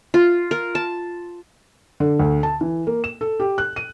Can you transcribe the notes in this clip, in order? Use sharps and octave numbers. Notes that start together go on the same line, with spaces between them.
F4
A#4
A5
D3
D2
A5
E3
A#3
E7
A4
G4
F#6
D#7